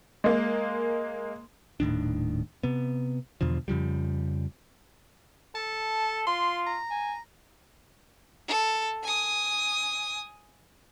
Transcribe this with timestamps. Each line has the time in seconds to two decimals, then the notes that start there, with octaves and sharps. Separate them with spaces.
0.24 G#3 A#3
1.80 D#1 A2 D#3 D4
2.63 C3 B3
3.41 E2 B2 D3 F3
3.68 F2 C#3 F3 G3
5.55 A4 A5
6.27 F4 C6
6.67 A#5
6.91 G#5
8.48 A4
9.03 G#5 D#6